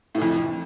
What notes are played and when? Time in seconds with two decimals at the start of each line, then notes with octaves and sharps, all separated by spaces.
0.15 A2
0.18 E3
0.22 F2